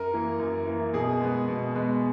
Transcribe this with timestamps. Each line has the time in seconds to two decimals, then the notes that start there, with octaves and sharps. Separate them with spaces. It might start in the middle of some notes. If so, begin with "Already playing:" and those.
Already playing: F#2 A#4
0.13 E3 A#3
0.40 F#2
0.67 E3 A#3
0.93 B2 G#4
1.21 G#3 B3
1.48 B2
1.75 G#3 B3